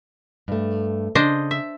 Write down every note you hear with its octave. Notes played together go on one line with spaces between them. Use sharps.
G2 A3
C#3 D4 C5 D#5
E5